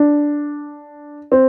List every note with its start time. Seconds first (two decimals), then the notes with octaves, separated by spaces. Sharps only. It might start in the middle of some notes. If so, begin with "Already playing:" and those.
Already playing: D4
1.32 C4